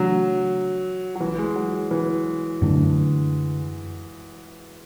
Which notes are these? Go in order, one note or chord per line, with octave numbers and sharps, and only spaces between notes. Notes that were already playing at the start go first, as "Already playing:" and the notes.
Already playing: C#3 E3 F#3 A3 D4
F#3
E3
G#3
F#3
E3
F#2 D3 A3 D4